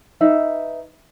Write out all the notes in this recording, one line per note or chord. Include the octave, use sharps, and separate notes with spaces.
D#4 B4 E5